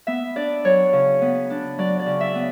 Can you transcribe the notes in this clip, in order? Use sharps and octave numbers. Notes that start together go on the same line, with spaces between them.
B3 E5
D4 D5
F#3 C#5
C#3
B3
D4
F#3 D5
D5
C#3
E5
B3